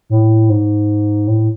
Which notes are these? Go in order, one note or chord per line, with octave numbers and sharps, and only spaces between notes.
A2
G#2
A2